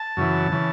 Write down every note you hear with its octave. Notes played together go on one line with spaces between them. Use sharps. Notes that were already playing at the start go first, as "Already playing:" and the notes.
Already playing: A5
F#2 C#3 E3
C#3 E3